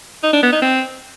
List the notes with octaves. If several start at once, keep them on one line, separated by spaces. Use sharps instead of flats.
D#4
D4
B3
D#4
C4